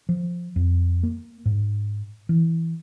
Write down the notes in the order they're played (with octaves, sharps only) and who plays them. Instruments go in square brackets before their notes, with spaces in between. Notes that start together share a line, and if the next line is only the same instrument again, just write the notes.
[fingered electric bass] F3
F2
A#3
G#2
E3